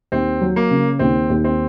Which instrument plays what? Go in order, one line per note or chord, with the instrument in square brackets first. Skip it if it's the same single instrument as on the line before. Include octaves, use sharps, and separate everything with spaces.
[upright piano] D#2 [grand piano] C4
[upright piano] F#3
[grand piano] A#3
[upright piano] C#3
[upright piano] D#2 [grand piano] C4
[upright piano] D#2
[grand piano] C4